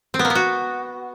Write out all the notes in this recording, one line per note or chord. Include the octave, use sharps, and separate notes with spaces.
C4
B3
A#3
B3
F#4